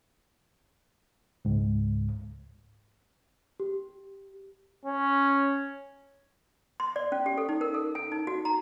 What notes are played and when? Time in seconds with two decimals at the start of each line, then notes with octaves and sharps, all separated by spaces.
1.45 C#2 G#2
3.60 G4
4.85 C#4
6.80 C6
6.96 D5
7.12 C#4
7.26 G4
7.38 A4
7.49 D#4
7.61 A#4
7.74 A4
7.95 G#5
8.12 D#4
8.27 F#4
8.45 A#5